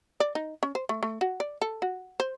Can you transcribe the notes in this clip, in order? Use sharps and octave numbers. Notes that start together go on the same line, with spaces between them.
D5
D#4
C#4
C5
A3
A3
F#4
D5
A4
F#4
C5